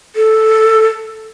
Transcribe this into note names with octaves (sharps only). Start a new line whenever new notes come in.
A4